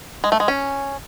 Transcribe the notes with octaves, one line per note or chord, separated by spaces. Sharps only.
G#3
A3
G#3
C#4